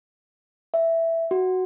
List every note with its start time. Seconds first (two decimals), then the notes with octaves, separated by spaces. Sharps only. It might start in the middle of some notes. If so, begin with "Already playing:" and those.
0.74 E5
1.31 F#4